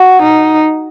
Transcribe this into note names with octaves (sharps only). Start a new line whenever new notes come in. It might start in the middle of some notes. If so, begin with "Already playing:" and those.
Already playing: F#4
D#4